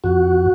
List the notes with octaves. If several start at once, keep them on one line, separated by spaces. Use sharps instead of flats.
F2 F#4